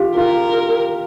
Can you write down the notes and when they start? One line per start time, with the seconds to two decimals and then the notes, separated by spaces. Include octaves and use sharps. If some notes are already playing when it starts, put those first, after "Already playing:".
Already playing: F4 G4
0.16 F4 A#4